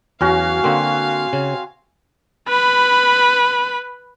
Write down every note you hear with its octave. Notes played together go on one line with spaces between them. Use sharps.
E2 F#3 C#4 F#4 F5 G#5
D3 A#3 C4
C#3
B4 B5